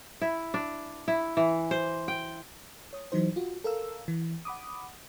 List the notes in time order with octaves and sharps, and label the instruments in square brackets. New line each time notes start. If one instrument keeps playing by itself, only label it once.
[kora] E4
D4
E4
E3
C5
G5
[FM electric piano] C#5 D#6
E3 F#3 D#4 C5
F4 F#4
A4 A#4 F5 E6
E3
F#5 B5 D6 D#6